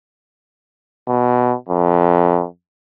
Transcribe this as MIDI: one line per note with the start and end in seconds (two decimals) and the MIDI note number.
1.08 1.55 47
1.69 2.45 41